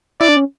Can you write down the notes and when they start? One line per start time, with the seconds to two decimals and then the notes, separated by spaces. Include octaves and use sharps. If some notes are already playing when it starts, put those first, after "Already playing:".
0.20 E4 D5
0.29 D4
0.37 C#4